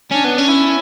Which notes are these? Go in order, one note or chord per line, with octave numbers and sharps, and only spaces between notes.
C#4 D4
B3
C#4
E4